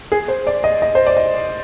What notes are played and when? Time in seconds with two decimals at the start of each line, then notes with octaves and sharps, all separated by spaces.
0.12 G#4
0.28 C5
0.47 D5
0.64 D#5
0.82 D#5
0.95 C5
1.07 D5
1.17 D#5